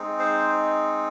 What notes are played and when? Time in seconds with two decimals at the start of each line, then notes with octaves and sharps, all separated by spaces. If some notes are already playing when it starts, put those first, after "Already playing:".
Already playing: G#3 C4 D#4
0.19 C5